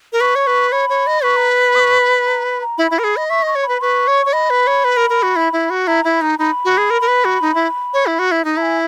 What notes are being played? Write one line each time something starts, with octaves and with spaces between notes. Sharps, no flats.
A#4
B4 C#6
C#5
B4
C#5 B5
C#5
D#5
B4 C#6
A#5
B5
D#6
C#6
B5
A#5
B5
A#5
E4 B5
E4
A#4
G#4
D#5
E5 C#6
D#5 C#6
C#5
B4 B5
B4 C#6
C#5
C#5
D#5 B5
B4
C#5
B4
A#4
A#4
F#4
E4
E4
F#4
E4 A#5
E4 B5
D#4 A#5
D#4 B5
F#4
G#4
A#4
A#4
B4
F#4
D#4
E4
C#5
E4
F#4
E4
D#4 A#5
E4 G#5